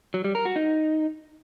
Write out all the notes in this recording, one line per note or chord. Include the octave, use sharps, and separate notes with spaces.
F#3
G3
A#4
F#4
D#4